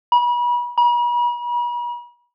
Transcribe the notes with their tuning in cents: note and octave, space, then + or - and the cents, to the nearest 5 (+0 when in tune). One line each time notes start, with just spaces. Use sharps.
B5 -35
B5 -45